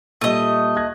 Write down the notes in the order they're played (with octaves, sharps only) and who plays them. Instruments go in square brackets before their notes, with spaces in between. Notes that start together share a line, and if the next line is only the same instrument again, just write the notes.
[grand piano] A#2 G3 [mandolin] A3 D#5
[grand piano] F#6 G#6 A#6